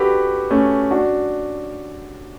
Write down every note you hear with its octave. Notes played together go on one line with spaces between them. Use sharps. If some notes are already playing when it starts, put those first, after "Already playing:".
Already playing: D4 F#4 G4 A4 B4
A3 C#4
D4 F#4